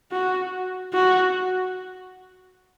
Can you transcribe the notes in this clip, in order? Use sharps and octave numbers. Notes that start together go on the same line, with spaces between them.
F#4
F#4